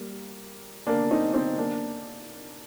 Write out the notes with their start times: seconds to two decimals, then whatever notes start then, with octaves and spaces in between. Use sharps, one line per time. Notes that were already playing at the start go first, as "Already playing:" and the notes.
Already playing: G3 A#3
0.87 A#3 D4
1.11 C4 D#4
1.34 C4 D#4
1.58 A#3 D4